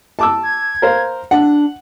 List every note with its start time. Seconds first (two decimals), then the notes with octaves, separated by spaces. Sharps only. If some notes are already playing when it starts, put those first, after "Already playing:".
0.19 A5 D6 E6
0.43 G#6
0.82 A#4 C5 F5
1.31 D4 F#5